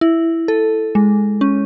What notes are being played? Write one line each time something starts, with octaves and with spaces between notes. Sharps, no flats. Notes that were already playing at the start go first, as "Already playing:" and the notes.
E4
A4
G#3
C#4